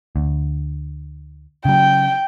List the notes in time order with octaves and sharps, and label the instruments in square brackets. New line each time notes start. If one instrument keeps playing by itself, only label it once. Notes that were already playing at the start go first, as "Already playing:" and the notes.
[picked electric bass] D2
[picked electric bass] C#3 F#3 [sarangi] G5